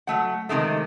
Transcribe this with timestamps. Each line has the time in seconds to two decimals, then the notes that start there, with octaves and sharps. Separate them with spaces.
0.07 F#3 A3 F#5
0.49 C3 D#3 G#3 A3